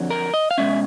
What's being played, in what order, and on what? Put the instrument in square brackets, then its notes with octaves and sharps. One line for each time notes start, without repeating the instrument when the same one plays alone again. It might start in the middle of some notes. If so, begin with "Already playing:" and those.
Already playing: [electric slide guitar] F2 D3 F#3
A#4
D#5
F5
B2 G#3 C#4 E5